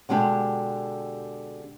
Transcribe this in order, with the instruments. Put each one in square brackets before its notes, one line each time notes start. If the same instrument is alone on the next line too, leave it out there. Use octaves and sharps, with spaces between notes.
[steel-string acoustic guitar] B2 D3 G#3 G4 E5 A5